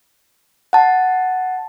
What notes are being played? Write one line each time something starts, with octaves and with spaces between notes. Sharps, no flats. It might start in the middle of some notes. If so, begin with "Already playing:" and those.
F#5 A5